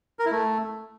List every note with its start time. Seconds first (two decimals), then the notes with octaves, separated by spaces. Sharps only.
0.19 A#4
0.25 E4
0.32 A3